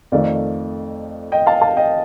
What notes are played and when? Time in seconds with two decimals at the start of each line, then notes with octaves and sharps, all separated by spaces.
0.12 F2 D#3 A3 D5 F5
1.32 D#5 G5
1.46 F5 A5
1.62 F5 A5
1.77 D#5 G5